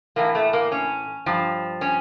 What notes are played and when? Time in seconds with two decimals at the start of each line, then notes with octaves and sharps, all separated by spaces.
0.16 A2 E3 A#3
0.35 A3
0.53 A#3
0.72 C#4
1.26 G2 F3
1.81 C#4